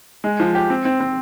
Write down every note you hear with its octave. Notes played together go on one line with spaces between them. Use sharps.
G#3
F3
G4
C4
C4
C4